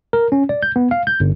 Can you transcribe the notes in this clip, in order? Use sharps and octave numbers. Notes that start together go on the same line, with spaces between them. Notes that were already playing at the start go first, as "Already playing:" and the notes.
A#4
C#4
D5
G6
B3
F5
G6
G1